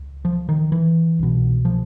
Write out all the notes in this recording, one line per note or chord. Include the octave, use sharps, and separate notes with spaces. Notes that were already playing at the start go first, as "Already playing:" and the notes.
Already playing: C#2
F3
D#3
E3
C2 B2
F3